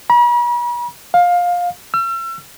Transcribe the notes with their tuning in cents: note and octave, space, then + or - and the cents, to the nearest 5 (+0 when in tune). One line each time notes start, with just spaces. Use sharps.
B5 -45
F5 +20
E6 +40